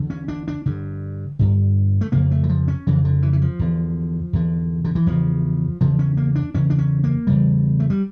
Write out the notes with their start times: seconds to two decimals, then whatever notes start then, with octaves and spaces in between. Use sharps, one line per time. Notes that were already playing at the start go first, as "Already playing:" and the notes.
Already playing: E2 D3
0.10 C#4
0.28 D4
0.48 D4
0.66 G2 D3
1.39 G2 D3
2.01 A3
2.12 F2 C#3 A#3
2.31 A3
2.44 E3
2.49 F3
2.68 C#4
2.87 F2 C#3 E3
3.05 D3
3.22 E3
3.33 E3
3.42 F3
3.59 E2 D3
4.33 E2 D3
4.85 D3
4.95 E3
5.06 E2 C#3 F3
5.81 E2 C#3 F3
5.99 C#4
6.17 A#3
6.35 D4
6.54 E2 C#3 C#4
6.70 D4
6.78 C#4
7.04 A#3
7.27 E2 C#3 G3
7.80 A3
7.90 G3